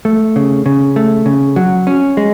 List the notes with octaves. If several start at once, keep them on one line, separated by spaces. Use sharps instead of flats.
A3
C#3
C#3
A3
C#3
F#3
C#4
G#3